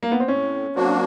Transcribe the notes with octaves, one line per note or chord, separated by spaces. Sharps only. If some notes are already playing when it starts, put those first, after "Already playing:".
A#3
B3
C4
A2 C#4
F#3 A#3 C4 D4 F#4